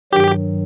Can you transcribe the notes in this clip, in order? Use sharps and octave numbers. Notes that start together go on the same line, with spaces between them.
G2 D#3 F#3 G4